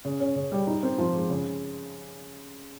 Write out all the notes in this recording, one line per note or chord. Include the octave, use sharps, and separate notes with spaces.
C#3
C#4
C#3
G3
D#4
C4
F3
G#3
C#3